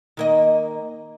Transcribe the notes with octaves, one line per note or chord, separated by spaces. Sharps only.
D#3 A#3 D#5